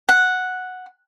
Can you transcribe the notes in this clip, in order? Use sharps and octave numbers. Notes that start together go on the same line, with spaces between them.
F#5